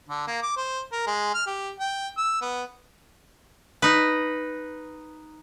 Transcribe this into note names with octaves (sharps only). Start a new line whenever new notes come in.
D3
A#3
D6
C5
A#4
G#3
F6
G4
G5
E6
B3
D#4 B4